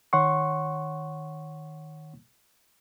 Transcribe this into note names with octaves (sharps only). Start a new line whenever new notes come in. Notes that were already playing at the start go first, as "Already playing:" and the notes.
D#3 C#5 F#5 C6 C#6